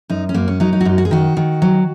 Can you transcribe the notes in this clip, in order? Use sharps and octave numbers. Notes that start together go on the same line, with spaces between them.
F#2 D#4
C#4
F#2 A#3
C#4
F#3 D#4
D#4
F#4
F#2 D#4
F#4
G#4
D#3 F#4
D#3
F#3